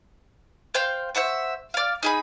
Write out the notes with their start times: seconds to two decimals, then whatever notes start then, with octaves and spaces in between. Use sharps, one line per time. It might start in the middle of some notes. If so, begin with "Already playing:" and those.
0.74 C5 F5 G5 G6
1.15 C5 E5 F#5 C#6
1.74 D5 F5
2.03 D#4 G#4 B5